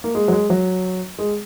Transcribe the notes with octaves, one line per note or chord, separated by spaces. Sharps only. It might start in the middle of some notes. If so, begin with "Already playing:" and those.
A#3
G#3
F#3
G#3
F#3
G#3